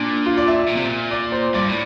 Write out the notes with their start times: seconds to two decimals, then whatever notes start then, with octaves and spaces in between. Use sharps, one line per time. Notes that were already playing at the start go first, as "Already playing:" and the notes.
Already playing: A#2 D4
0.26 F4
0.38 D5
0.48 E5
0.68 A#2
0.77 C3
0.85 A#2
1.11 D5
1.32 C5
1.54 G2 D5
1.69 A2